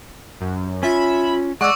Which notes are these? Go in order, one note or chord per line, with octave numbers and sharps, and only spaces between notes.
F#2
C#4 F4 E5 B5
G#3 D5 F#5 C#6 D6 E6